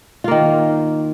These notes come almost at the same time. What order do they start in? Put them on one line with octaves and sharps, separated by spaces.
F4 A#3 D#3